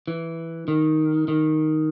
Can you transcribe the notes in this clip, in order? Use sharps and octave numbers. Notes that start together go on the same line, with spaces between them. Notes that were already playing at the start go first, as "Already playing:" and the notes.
E3
D#3
D#3